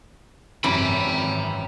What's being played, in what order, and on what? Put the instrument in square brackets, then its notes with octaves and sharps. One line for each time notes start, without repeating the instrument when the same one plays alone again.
[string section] G#1 [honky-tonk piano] F#2 C3 [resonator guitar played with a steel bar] E3 [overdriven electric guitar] G5 B5